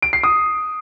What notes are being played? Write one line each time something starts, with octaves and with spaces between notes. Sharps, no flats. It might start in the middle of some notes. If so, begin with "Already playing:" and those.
D7
C7
D#6